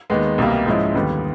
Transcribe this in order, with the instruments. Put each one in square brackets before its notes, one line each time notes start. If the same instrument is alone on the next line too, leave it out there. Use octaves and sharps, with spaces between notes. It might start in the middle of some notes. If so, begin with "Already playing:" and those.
[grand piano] D#2 D#3 G#3 B3
C2 B2 G3 A#3
G#2 F3 G#3 C#4 E4
D#2 D3 G3 B3